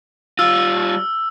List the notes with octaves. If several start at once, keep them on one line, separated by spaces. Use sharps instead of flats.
G3 F4 E6 F6